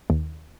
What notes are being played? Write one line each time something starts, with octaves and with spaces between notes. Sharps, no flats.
D#2